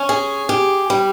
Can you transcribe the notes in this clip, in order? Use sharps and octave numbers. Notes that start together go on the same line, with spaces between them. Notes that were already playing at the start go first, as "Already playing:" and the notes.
Already playing: C#4
G#4
G4
G3